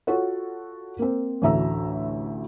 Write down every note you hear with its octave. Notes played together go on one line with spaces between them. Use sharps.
F4 F#4 A4 C#5 F#5
A#3 C4
A1 D2 F#4 E5 A#5 E6